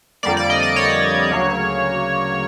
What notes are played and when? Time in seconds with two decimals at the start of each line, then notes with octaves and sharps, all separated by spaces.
0.23 F2 D3 G3 A#3 D5
0.37 D5
0.50 D#5
0.63 D5
0.76 C#5
1.31 D2 C#3 F#3 A#3